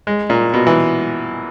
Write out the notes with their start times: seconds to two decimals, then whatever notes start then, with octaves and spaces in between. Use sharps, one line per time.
0.07 G#3
0.30 A#2
0.54 B2
0.67 E3